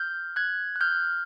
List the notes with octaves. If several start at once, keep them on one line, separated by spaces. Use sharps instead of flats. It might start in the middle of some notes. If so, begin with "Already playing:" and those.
Already playing: F6 G6
F#6 G#6
F#6
F6 G6